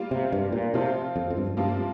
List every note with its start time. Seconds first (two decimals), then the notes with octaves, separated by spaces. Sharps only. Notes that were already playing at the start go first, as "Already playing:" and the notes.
Already playing: G3 A#3 F4
0.11 C3
0.32 G2
0.52 A#2
0.74 C3 F3 C4 F4
1.16 F2
1.30 F2
1.37 G2
1.57 G2 C3 F3 A#3 F4